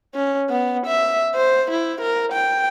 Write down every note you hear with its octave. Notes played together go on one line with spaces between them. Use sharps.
C#4
B3
E5
C5
E4
A#4
G5